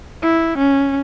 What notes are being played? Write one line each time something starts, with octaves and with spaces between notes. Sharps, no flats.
E4
C#4